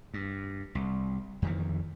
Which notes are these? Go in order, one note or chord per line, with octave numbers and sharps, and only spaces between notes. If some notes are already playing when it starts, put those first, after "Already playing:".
G2
C2
F2 D#3 E3